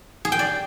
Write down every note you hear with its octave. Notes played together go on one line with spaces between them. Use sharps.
G#4
G5
D5